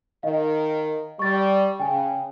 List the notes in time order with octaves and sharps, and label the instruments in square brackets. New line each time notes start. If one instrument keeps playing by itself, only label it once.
[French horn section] D#3 A#4 [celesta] D#5 F5
[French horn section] G3 [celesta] C#6 A6
[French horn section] C#3 [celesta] G5 G#5